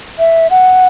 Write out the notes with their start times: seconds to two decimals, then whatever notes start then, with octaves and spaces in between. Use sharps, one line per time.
0.19 E5
0.50 F#5